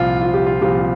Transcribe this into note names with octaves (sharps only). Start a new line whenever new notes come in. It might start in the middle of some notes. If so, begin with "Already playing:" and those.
Already playing: C2 A#2 F3 F4
F4
G4
F4
C2 A#2 F3 G4